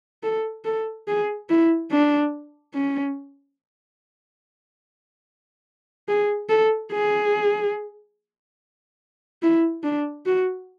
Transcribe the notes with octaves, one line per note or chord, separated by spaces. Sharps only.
A4
A4
G#4
E4
D4
C#4
G#4
A4
G#4
E4
D4
F#4